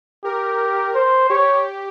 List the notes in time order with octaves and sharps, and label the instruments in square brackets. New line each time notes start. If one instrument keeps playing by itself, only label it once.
[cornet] G4 [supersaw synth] A#4
[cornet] C5
[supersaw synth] G4 [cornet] C#5